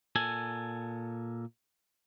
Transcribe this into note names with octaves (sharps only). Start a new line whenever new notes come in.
A#2 A4 G#5